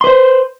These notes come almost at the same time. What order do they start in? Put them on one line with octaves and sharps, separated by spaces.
C6 B4 C5